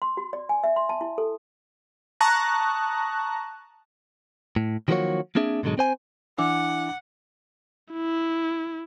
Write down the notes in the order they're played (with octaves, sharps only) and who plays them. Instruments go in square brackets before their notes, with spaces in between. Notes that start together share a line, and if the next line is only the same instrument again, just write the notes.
[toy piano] C6
F#4
D5
G#5
E5
C6
A5
E4
A4
[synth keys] A5 A#5 C#6 D#6 F#6 A#6
[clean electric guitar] A2
D#3 F3 F#3 A#3 F#4 C#5
A#3 C4 D4 G#4 E5
G#2 B2 D3 F#3 G#3
C4 C5 G#5
[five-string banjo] E3 [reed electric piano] D4 [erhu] F#5 [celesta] D6
[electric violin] E4